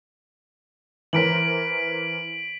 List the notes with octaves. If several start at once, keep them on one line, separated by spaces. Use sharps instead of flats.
E3 A#4 C5 B6 D7 F#7